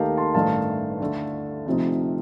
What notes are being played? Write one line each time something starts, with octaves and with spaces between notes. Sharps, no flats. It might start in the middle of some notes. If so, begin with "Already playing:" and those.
Already playing: D#2 D#3 A3 D#4 G4 A#4 F5 A5
A5 C6
A1 G2 D#3 A3 D#4 F5 A5
D2 D3 A3
D2 C3 F3 C4 D#4